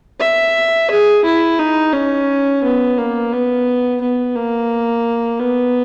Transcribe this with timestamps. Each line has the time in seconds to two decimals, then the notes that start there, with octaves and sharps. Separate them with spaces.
0.20 E5
0.90 G#4
1.25 E4
1.59 D#4
1.93 C#4
2.63 B3
2.97 A#3
3.32 B3
4.01 B3
4.35 A#3
5.40 B3